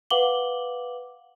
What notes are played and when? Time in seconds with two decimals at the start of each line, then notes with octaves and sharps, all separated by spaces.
0.10 B4 F5 F#5 D6 F#7 G7